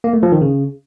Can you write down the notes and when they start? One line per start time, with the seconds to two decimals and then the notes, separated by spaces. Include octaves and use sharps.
0.04 A#3
0.13 A3
0.23 F3
0.32 D#3
0.41 C#3